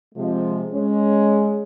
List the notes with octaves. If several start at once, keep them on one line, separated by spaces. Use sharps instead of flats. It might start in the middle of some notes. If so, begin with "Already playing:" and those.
C3 F3 G#3
G#3 C#4